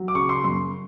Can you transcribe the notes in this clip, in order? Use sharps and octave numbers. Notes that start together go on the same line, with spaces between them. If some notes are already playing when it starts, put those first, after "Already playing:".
Already playing: F#3
D6
C#3 C#6
C6
F#2 C6